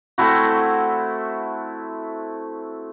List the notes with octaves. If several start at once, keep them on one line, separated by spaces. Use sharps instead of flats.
A3 C4 E4 F#4